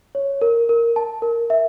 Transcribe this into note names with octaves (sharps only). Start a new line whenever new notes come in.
C#5
A#4
A#4
A5
A#4
E5